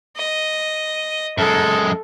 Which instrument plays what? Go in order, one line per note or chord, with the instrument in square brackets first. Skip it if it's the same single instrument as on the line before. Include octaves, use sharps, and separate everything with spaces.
[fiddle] D#5
[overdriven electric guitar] F#2 G#3 [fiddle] A4